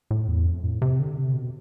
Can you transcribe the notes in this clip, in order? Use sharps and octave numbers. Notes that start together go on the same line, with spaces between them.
A2
E2
F2
A2
C3
D3
C3
B2